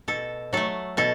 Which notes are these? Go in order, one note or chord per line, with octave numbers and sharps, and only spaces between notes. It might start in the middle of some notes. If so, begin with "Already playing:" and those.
B2 A4
F#3 A3 A4
B2 A4